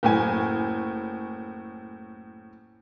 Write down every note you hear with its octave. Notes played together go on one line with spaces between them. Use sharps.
F#1 A2 G#5